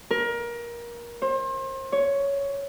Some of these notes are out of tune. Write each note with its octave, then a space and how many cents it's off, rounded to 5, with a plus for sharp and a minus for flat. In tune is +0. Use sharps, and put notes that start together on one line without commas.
A#4 +25
C5 +35
C#5 +10